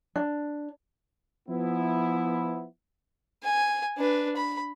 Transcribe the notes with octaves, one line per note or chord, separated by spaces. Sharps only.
D4
F3 B3 E4
G#5
D4 B4
B5